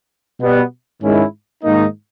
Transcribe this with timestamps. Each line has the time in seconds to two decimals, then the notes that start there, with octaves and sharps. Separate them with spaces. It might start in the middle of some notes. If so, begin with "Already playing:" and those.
0.40 B2 G3 B3
1.02 G#2 D#3 G#3 C#4 E4
1.63 G#2 D#3 A#3 D#4